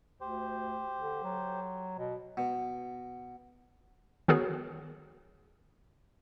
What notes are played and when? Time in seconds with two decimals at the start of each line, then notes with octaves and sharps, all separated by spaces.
0.21 D2 G4 C5
1.00 D3
1.23 F#3
1.98 B2
2.37 B2
4.28 D#3 B3 F#4 G#4 A#4 C#5